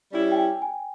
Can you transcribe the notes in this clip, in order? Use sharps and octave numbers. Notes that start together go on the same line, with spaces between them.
G3 C#4 E4 G4
G5
G#5
G#5